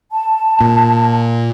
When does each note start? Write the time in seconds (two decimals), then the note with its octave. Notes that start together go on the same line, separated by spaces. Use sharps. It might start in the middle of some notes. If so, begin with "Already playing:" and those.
0.11 A5
0.61 A#2